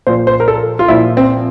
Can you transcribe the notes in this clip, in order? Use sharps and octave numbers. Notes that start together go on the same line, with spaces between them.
A#2 F3 C5
C5
A#4
A4
F4
A#2 F3 E4
C4